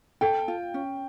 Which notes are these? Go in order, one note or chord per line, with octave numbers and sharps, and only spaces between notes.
A4 G5
F4
C#4